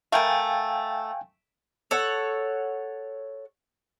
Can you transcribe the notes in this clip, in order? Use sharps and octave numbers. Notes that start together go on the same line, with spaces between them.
A3 A#4 F5 G5 G#5
A4 C#5 F#5